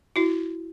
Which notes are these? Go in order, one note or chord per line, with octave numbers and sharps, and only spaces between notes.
E4 F#4